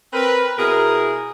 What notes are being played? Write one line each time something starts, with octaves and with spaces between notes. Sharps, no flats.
C4 A#4 B4
B2 E4 G#4 A#4